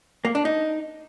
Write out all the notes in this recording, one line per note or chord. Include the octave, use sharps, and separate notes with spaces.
A#3
D4
D#4